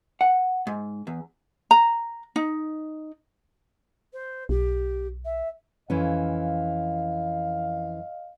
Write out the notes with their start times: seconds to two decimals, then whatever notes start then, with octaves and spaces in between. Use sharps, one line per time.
0.21 F#5
0.67 G#2
1.07 E2
1.71 A#5
2.36 D#4
4.13 C5
4.49 B1 G4
5.25 E5
5.90 F2 E3 C#4 D#5 F5